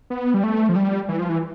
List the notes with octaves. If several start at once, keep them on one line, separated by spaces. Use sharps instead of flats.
B3
G3
A3
F3
G3
E3
F3
E3